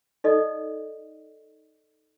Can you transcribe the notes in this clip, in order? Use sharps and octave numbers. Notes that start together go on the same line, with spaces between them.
D#4 A4 D5 D#5